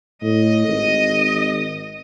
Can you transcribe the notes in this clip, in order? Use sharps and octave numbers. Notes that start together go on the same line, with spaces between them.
A2 D#5
G#1